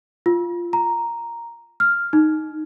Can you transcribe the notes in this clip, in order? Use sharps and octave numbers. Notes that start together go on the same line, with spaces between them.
F4
A#5
F6
D#4